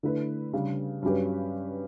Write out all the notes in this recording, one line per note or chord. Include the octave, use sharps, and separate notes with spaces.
D3 A3 E4 B4
C#3 G3 D4
G2 F#3 C#4 G4 B4